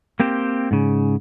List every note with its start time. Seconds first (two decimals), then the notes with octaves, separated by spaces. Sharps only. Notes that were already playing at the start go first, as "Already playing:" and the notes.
0.20 A#3 C4 G4 C5
0.71 G#2 C#3